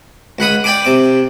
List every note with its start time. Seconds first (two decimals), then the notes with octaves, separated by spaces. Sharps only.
0.39 C#2 F#5 B5 D#6
0.64 D5 G5 G#5 B5 D6
0.85 C3 D6